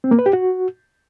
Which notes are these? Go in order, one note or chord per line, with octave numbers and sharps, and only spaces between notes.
C4
A#3
B4
G4
F#4